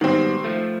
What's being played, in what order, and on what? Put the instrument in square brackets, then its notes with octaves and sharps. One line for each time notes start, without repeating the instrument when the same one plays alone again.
[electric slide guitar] G#2 B2 G3 [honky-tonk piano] D#3 C4
[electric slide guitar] F3 A3